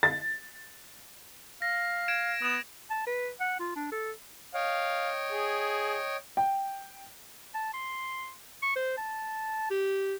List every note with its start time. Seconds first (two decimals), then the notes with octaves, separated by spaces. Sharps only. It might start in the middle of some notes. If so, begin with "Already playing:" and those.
0.03 A6
1.62 F5 A#6
2.08 G#6 D7 E7
2.42 B3 D#6 E7
2.90 A5
3.07 B4
3.40 F#5
3.60 F4
3.76 D4
3.92 A4
4.54 C#5 D#5 F5 G5
5.33 G#4
6.37 G5
7.55 A5
7.74 C6
8.62 C#6
8.76 C5
8.98 A5
9.71 G4